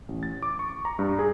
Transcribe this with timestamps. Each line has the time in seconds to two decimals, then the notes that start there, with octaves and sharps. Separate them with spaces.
0.08 A1
0.23 A6
0.43 D6
0.59 C#6
0.85 A#5
0.99 G2
1.19 G#4